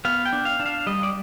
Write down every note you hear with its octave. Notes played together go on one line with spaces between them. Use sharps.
B3 F5
G5
D4
F5
D4
F5
G3 D#5
D5